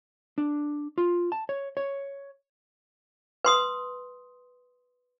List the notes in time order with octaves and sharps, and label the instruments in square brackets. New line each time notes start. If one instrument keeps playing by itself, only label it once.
[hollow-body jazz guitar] D4
F4
A5
C#5
C#5
[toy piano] B4 C6 D#6